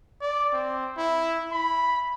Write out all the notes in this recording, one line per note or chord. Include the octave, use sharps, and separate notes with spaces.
D5
C4
E4
B5